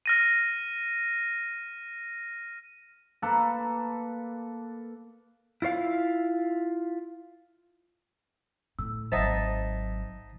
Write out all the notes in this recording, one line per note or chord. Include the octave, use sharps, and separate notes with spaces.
F6 A#6 D#7
A#3 A4 B4
E4 F4 C5 F5
A2 E6
G#1 F#3 D#4 C5 E5 F#5 A5 A6